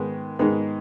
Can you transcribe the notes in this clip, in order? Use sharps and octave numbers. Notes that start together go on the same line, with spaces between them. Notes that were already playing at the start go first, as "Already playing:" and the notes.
Already playing: G#2 D#3 G#3 B3
G#2 D#3 G#3 B3 D#4